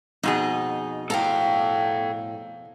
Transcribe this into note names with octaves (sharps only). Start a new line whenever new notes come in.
F2 B2 D#4 G#4
A2 A4 F5 G5 A#5